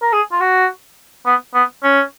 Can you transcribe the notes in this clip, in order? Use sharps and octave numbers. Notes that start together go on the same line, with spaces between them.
A#4
G#4
F4
F#4
B3
B3
C#4